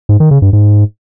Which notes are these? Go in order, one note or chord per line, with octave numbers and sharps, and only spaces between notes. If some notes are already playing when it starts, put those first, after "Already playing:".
G#2
D#3
C#3
G2
G#2